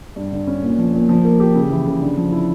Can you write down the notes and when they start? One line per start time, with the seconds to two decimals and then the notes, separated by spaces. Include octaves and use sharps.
0.16 G2
0.32 D3
0.47 C#4
0.63 A#2
0.78 F3
0.94 A#2
1.09 F3
1.25 A#3
1.40 G4
1.55 C#3
1.70 E3
1.86 C#3
2.02 D3
2.17 F3
2.32 E4